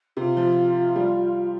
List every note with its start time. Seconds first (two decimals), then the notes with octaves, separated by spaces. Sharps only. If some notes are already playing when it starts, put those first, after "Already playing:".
0.17 C3 F4
0.37 F3
0.96 G3